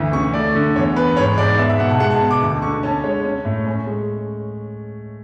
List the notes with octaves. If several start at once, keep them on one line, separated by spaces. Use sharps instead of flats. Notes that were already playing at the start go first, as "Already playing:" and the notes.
Already playing: D2 E3
C#3 C#6
A3 D5
D3
E2 C#5
B3 B4
G#2 C#5
G#2 D5
B3 E5
E5
B2 F#5
A5
G#3 F#5
A5
B2
D6
D2
D3 C#6
C#4 A5
G#3 C#5
C#4
A2
C#4
G#3